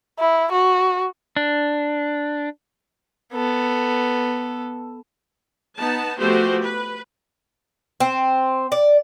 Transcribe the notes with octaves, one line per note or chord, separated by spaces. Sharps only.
E4
F#4
D4
B3 A4
B3 D#4 A5
F3 A3 B3 F#4 G4 C5
B4
C4
D5